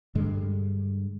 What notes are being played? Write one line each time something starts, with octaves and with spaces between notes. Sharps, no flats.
G2 D3 G#3